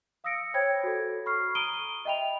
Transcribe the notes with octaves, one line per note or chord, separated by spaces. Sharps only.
F5 D#6 E6 A#6 C#7 D7
C5 C#5 G5 B5 G#6
F#4 A4
B5 C#6 F6 C7
A#5 D#6 D7 D#7 G7
D#5 E5 G5 B5 F7